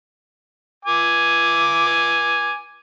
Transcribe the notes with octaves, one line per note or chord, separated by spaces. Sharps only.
G#5 D6